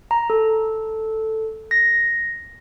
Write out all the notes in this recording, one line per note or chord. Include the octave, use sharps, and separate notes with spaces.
A#5
A4
A#6